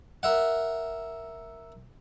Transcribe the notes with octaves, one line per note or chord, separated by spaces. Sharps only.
A#4 E5 F#5